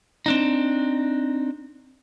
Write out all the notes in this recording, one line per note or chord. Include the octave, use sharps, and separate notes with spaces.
C4 D4 D#4